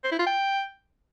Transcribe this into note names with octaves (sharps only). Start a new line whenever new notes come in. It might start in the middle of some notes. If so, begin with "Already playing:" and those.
C5
E4
F4
G5